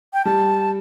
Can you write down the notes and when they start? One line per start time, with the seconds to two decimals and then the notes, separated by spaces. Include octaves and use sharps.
0.13 G5
0.25 G3 A5